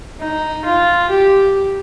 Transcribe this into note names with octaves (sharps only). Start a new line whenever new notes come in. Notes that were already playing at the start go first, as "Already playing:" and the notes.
D#4
F4
G4